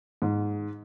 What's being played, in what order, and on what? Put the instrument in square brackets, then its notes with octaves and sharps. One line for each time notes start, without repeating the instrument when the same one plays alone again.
[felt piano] G#2